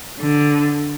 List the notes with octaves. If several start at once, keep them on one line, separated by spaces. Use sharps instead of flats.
D3